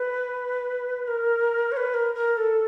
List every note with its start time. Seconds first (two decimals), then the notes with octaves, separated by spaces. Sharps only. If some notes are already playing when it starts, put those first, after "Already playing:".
Already playing: B4
1.07 A#4
1.72 C#5
1.77 B4
1.94 A#4
2.15 A#4
2.37 A4